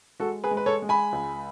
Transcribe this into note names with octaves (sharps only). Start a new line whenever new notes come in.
G#3 F#4 A4
G#4 B4
G#3
B4
A4 C#5
G#3
G#5 B5
C#2